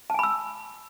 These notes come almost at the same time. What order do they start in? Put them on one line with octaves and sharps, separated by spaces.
A5 G#5 B5 E6